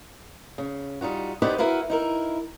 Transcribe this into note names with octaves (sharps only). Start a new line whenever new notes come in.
C#3
G3 D#4 F4 F#4
B3 D#4 G4 B4 C5 D5
E4 F#4 A#4 B4 F5
D#4 E4 A#4